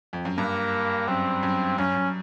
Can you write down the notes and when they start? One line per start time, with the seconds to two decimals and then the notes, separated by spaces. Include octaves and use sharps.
0.13 F2
0.25 F#2
0.37 G2 A#3
1.08 F#2 C4
1.43 F#2
1.78 F#2 C#4
1.95 F#2